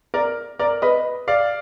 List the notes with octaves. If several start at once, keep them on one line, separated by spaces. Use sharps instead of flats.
A#4 D5
A#4 D5
B4 D#5
D5 F5